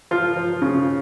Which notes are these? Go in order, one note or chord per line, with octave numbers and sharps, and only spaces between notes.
F3 F4
F3
C#3